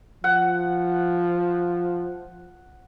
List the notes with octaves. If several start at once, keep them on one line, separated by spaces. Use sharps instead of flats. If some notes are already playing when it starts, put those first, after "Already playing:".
F3 F#5